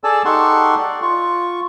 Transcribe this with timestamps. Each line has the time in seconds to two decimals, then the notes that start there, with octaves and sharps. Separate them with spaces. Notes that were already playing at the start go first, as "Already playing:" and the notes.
0.04 G#4 A4 D5 G#5 A5 E6
0.25 D#4 G4 A4 F#5 C6 C#6
0.78 D5
1.02 F4 C#6